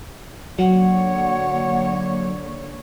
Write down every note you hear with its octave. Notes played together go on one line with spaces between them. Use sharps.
D3 F#3 A#3 C#5 F#5